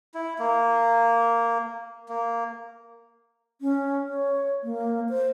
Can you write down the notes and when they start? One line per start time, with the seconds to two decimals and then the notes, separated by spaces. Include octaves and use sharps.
0.14 E4
0.39 A#3
2.09 A#3
3.61 C#4
4.08 C#5
4.63 A#3
5.09 C5